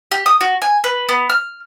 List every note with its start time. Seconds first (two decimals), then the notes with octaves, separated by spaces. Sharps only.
0.12 G4
0.26 D#6
0.41 F#4
0.62 G#5
0.84 B4
1.09 B3
1.30 F6